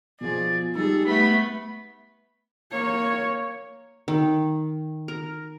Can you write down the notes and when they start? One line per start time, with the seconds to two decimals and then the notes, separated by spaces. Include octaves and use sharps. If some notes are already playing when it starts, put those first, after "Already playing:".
0.21 B2 F3 G#4 D5
0.75 G3 G#3 D#4 G#4 A4
1.06 A3 B3 B5
2.71 A#3 C#5
4.08 D#3
5.08 A#4